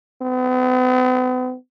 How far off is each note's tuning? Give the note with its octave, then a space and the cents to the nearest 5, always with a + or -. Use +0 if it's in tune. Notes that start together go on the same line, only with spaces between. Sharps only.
B3 +45